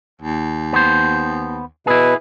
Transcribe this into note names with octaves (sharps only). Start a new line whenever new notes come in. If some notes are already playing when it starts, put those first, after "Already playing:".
D#2
B3 C5
B2 E4 G#4 B4